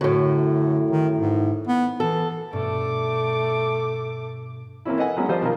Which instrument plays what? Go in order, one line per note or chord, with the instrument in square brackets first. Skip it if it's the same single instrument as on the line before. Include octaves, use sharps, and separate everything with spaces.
[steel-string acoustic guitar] F#2 A2 [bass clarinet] D3
[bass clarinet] D#3
G#2
B3
[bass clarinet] E3 [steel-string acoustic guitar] A4
[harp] G2 B2 [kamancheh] A3 D6
[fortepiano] E3 A#3 C4 C#4 E4
A4 B4 D#5 F#5 G#5
F#3 G#3 A#3 B3 C#4
F3 G3 G4 C5 D5 D#5
B2 D#3 A#3 F4 A#4